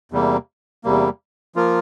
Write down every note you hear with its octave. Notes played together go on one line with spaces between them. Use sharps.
E2 C3 G3 A#3
E2 C3 G3 A#3
F3 A#3 F4 A#4